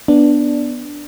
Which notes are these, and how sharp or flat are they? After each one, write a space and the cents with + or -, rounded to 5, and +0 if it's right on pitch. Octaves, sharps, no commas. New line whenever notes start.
B3 +0 D4 +0